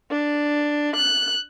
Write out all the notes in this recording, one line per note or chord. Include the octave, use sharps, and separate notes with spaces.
D4
F#6